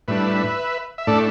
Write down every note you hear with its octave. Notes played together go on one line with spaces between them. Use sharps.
A2 G3 D4 B4 E5
E5
A2 A3 D4 A4 D5